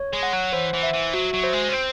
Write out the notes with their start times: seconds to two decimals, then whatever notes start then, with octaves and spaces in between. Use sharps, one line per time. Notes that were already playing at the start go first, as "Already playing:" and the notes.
Already playing: C#5
0.13 G#3
0.23 F#5
0.33 F#3
0.53 E3 C5
0.73 E3
0.83 E5
0.93 E3
1.13 F#3 F#4
1.33 F#3
1.44 C5
1.53 G#3
1.69 C#4
1.73 C4 C5